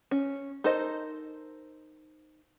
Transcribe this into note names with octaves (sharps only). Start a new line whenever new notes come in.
C#4
D#4 A4 A#4 C5 D#5